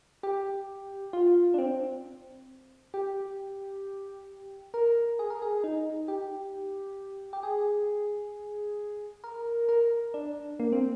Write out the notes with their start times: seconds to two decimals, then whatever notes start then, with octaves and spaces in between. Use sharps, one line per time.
0.23 G4
1.13 F4
1.54 D4
1.58 C4
2.94 G4
4.74 A#4
5.19 G#4
5.30 A#4
5.42 G#4
5.64 D#4
6.08 G4
7.33 G4
7.43 G#4
9.24 A#4
9.69 A#4
10.14 D4
10.60 A#3
10.73 C4